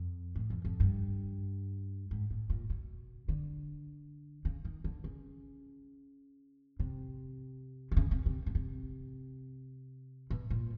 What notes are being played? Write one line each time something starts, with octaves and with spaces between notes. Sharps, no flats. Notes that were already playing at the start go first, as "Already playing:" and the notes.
Already playing: F2
A2
F2
F2
G2
G#2
A2
A#2
B2
D3
C#3
D#3
D3
C#3
C3
C3
C#3
C3
C3
B2
C3
B2
A#2